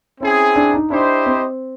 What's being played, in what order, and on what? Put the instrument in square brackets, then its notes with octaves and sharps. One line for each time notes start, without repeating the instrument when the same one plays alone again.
[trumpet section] C4 E4 G#4 [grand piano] C#4
[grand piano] D4
D#4
[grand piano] D4 [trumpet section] E4 G4 C5 D#5
[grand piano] C4